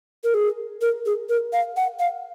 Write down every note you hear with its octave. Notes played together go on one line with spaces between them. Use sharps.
A#4
G#4
A#4
G#4
A#4
F5
F#5
F5